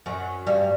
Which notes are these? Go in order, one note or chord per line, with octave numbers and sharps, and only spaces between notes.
F#2 F#3
G2 G3